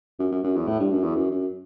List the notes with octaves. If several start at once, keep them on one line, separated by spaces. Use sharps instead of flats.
F#2
F#2
F#2
E2
A2
G2
F#2
E2
F#2
F#2